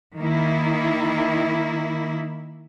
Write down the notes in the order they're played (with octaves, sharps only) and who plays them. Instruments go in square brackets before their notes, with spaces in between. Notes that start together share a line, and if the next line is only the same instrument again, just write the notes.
[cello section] D#3 A#3 E4